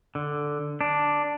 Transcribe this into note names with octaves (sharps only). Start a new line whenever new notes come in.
D3
D4